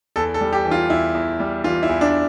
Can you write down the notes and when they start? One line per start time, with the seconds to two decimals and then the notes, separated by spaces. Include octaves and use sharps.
0.16 E2 A4
0.34 A4
0.41 G3
0.53 G4
0.65 E3
0.71 F4
0.90 E2 E4
1.14 E2
1.40 G3
1.64 E3 F4
1.83 E4
1.89 E2
2.01 D4